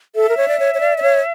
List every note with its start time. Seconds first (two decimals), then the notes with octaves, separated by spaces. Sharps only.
0.15 A4 E5
0.29 A#4
0.37 C#5
0.48 D5
0.60 C#5
0.74 C#5
0.80 D5
0.98 D5
1.02 C#5